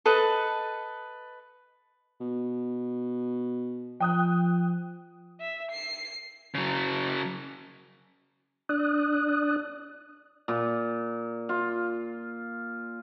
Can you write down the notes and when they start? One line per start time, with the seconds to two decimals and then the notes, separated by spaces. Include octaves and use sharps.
0.06 A4 B4 D#5 A5
2.20 B2
4.00 F3 G5 D#6 F#6
5.40 E5
5.71 C7
6.55 C#3 F#3
8.69 D4 D5 D#6 F#6
10.48 A#2
11.49 F4